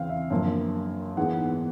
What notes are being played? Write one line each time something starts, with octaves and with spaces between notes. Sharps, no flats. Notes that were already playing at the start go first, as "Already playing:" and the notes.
Already playing: E2 C#3 E3 C4 F5 G5
E5
F#2 D3 F3 A#3
G#2 E3 G#3 B3 F#5